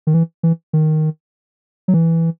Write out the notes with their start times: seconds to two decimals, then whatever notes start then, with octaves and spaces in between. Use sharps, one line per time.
0.07 D#3
0.14 E3
0.43 E3
0.73 D#3
1.88 F#3
1.94 E3